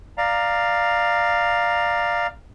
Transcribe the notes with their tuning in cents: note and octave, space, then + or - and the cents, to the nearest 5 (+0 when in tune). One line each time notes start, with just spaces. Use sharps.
D5 +15 F5 +0 A#5 +0